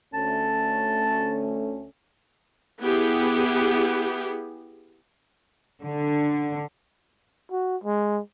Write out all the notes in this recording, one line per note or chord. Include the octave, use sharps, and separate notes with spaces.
D2 A3 C#4 A5
B3 E4 G4 G#4
D3
F#4
G#3